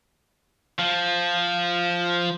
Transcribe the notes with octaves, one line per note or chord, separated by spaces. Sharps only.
F3